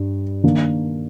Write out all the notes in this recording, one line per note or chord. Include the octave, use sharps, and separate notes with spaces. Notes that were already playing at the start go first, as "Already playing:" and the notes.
Already playing: G2
D#3 A#3 D4